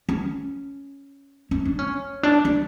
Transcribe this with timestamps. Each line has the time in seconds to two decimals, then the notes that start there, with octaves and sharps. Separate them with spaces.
0.09 C#4
1.51 C#4
1.65 D4
1.79 C#4
2.23 D4
2.45 D4